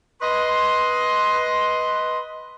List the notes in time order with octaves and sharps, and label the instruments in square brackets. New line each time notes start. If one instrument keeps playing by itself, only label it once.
[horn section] B4 D#5 C6